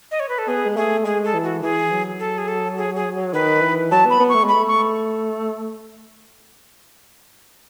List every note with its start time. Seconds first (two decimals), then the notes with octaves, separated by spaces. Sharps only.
0.11 D#5
0.20 C#5
0.29 B4
0.38 A4
0.48 B3 G#4
0.65 G#3
0.76 A3 G#4
1.05 G#3 G#4
1.24 A4
1.34 E3
1.43 F#4
1.62 E3 G#4
1.92 F#3
2.19 A4
2.38 G#4
2.48 A4
2.77 G#4
2.96 G#4
3.34 D#3 B4
3.62 E3
3.91 F#3 A5
4.05 B3 B5
4.20 B3
4.29 A3 C#6
4.43 G#3
4.48 B5
4.54 A3
4.68 C#6